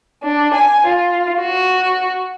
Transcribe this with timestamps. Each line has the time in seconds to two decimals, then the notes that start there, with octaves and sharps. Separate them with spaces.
0.23 D4
0.54 G#5
0.86 F4
1.40 F#4